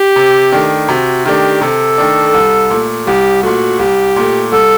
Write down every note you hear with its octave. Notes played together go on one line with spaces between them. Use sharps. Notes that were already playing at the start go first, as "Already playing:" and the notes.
Already playing: G4
C3
D#3 A3 D4
C3 F#4
D#3 A3 D4 G4
C3 A4
D#3 A3 D4
C2
A#2 A3
C2 G4
A#2 A3 F#4
C2 G4
A#2 A3
C2 A4